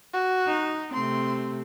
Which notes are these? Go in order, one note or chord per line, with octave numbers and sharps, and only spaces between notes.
F#4
D#4
C3 A3 C4 C6